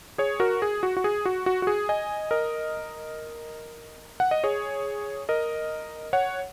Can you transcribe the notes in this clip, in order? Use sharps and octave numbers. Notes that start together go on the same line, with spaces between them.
G#4 C#5
F#4 A#4
G#4
F#4
F#4
G#4
F#4
F#4
F#4
G#4
D#5 G#5
A#4 D#5
F#5
D#5
G#4 C#5
A#4 D#5
C#5 F#5